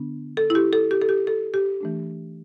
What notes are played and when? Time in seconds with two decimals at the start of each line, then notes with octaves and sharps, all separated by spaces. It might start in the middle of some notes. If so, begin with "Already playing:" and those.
Already playing: D3 B3 D4
0.37 A4
0.50 E4
0.55 G4
0.73 A4
0.91 G4
1.02 A4
1.09 G4
1.27 A4
1.54 G4
1.81 E3 A3 D4